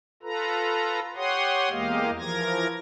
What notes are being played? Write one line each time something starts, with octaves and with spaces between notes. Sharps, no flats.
F4 A4 B4 A#5
G4 C#5 F#5 C6 D#6
E2 G#3 A#3 G4 D#5 F5
E3 F3 A#4 G#6 A#6